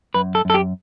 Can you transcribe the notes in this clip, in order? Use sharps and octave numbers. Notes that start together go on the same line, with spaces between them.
F#2 B4
A4
F#2 A4
G4